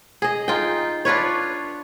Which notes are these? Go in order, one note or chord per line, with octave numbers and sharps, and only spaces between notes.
G#4 D#5
D#4 F4 G5
D4 F4 B4 C#5